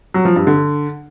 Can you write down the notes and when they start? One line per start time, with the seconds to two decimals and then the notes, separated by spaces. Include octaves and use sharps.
0.14 F#3
0.25 F3
0.36 G2
0.47 D3